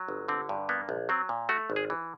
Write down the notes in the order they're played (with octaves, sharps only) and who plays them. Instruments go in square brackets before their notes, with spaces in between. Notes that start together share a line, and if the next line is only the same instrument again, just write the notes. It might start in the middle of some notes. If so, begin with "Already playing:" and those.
Already playing: [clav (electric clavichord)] F#3
G1
D3 C4
G2
A#3 B3
A#1
F#3 C4
A#2
A3 F#4
G#1
G#4
E3